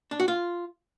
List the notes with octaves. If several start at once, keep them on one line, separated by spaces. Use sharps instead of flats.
D4
F#4
F4